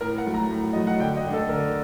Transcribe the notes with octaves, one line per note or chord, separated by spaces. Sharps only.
A2 A#4
F#5
F#3 A3
A#5
A2
F#3 A3 D#5
F#5
D3 G5
D#5
A3 D4
A4
D3 A#4